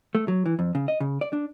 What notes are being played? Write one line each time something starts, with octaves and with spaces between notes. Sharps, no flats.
A3
F#3
E3
F2
C#3
D#5
C#3
D5
D4